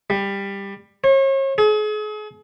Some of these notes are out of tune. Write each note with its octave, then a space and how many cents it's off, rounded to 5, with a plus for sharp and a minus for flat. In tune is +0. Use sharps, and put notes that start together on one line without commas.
G3 +15
C#5 -40
G#4 +40